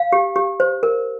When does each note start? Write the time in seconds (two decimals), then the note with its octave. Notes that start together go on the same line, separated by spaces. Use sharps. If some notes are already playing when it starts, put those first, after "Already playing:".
Already playing: F5
0.13 G4
0.36 G4
0.60 C5
0.83 A#4